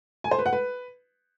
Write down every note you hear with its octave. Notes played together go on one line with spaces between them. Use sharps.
G#5
C5
B4
F#5
B4